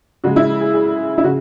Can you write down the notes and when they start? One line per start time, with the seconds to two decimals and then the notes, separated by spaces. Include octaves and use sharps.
0.24 C#3 G#3 F#4
0.36 E4
0.61 G#4
0.73 G#4
1.18 E4
1.24 C#3 F#4